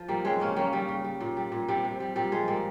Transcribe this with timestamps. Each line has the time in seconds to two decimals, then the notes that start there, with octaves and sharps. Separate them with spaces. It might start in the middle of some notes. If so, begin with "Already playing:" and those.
Already playing: F3
0.08 A#2 G3 A#3
0.25 C#3 G#3 C4
0.40 C#3 A#3 C#4
0.56 G3 A#3 C#4
0.73 C#3 G3
0.88 C#3
1.04 G3
1.21 A#2
1.37 G3
1.52 A#2
1.68 C3 G3
1.84 C3
2.00 G3
2.16 A#2 G3
2.32 F3 G#3
2.48 A#2 G3 A#3